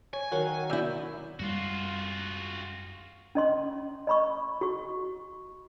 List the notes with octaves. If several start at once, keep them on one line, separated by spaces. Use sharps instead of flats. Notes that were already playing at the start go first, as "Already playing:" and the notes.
C#5 G#5
D#3 F#3 A#4 C#5 F5 F#5
F#2 E4 D5 E6 G6
F#2 G3 G#3 F4 F#4
C#4 D#5 C6
D#5 B5 C#6
F#4 C#6